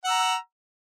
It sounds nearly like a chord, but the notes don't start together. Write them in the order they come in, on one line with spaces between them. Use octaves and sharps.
F#5 E6 A#5